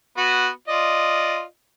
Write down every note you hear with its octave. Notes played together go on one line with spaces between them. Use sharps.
B3 F#4
F4 D5 D#5